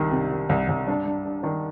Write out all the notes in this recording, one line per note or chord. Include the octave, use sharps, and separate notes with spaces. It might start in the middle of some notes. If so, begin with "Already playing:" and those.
Already playing: C2 D#3 G4
C3
D#3
C2
C2
G2 D4
G2
G2
D#3 D4